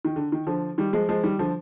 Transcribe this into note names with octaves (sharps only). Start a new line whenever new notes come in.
D#3
D3
D#3
D3 F3
D#3 G3
F3 G#3
F3 G#3
D#3 G3
D3 F3